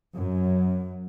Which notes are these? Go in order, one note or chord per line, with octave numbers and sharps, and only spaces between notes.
F#2